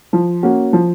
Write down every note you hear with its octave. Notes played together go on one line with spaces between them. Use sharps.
F3
A#3 C#4 F#4
F3